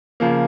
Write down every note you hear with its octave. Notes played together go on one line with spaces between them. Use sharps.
C#3 F3 A#3